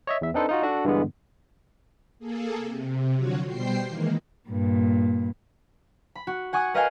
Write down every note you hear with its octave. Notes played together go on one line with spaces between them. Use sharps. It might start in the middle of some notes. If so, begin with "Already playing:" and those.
C#5 D#5 E5
E2 E5
C4 D4 D#4 A4 B4 C5
D#4 F4 F#4
D4 F#4 A4
G2 D3 E3 G#3 B3
A#3 G#4 A4
C3
D3 F3 F#3 F4 F#4 C#5
B2 G3 C5 G5 C7
D#3 E3 G#3 A#3
G2 A#2
B5
F#4
F#5 G#5 C#6 D#6
A#4 B4 D#5 F5 G5 G#5